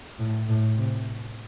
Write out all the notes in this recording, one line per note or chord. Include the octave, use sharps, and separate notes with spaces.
A2
A2
C3